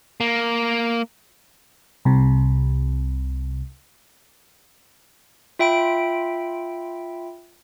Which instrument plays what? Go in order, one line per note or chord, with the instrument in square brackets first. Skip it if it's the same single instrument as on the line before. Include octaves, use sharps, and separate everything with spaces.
[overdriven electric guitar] A#3
[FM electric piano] C2 C3
[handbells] F4 E5 G5 B5 D7